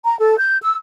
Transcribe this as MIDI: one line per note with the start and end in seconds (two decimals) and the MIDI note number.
0.04 0.17 82
0.19 0.36 69
0.38 0.57 91
0.61 0.75 88